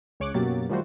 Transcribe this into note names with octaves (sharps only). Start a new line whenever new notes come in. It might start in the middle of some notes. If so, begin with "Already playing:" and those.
C#2 C#3 C#5 C#6 D6 F#6
F#2 B2 F#3 A#3 G4 A6
D#3 F3 G3 A3 F#4 C5